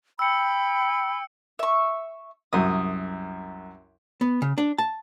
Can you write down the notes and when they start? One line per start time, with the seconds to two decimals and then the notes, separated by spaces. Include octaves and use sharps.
0.19 G5 B5 E6 C#7
1.59 E5 C#6
2.53 C2 F#2 D#6
4.21 B3
4.42 C#3
4.58 D4
4.78 A5